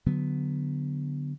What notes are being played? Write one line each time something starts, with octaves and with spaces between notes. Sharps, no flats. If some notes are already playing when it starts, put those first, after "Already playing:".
D3 F#3 B3